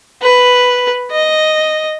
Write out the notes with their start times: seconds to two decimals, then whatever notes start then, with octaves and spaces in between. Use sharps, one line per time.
0.22 B4
1.11 D#5